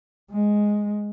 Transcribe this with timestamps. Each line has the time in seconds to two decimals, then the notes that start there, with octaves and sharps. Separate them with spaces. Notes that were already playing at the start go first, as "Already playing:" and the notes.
0.31 G#3